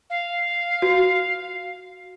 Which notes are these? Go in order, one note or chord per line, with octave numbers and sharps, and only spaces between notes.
F5
F#4